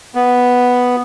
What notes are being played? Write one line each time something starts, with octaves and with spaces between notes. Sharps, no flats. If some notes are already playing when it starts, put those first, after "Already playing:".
B3